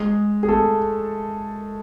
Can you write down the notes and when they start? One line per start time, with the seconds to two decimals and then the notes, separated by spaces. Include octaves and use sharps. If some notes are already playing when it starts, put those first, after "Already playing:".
Already playing: G#3 G#4
0.43 G#4
0.48 A3 A4